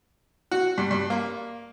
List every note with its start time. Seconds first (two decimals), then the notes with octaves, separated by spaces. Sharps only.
0.51 F#4
0.78 G2
0.91 G2
1.10 A#3